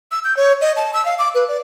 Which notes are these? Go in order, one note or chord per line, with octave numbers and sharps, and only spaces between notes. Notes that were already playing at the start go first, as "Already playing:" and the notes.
E6
G6
C#5
D#5
A5
E6
F5
D6
B4
D5